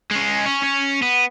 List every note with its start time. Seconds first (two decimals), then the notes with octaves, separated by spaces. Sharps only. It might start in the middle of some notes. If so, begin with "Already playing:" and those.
0.11 G#3 C#4
0.46 C#4
0.64 C#4
1.02 B3